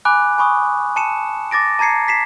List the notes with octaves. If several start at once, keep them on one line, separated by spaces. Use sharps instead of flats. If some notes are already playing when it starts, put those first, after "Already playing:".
G#5 B5 D6 F#6
G#5 B5 C#6 D#6
A5 C#7 E7
D6 A6 A#6 D7
A5 A#5 G#6 C7 C#7
B6 C7 E7